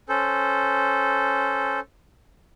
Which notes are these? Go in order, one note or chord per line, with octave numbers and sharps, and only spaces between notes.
C#4 A4 C5